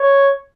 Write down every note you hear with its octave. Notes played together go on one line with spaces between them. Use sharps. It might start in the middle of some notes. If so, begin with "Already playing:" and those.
Already playing: C#5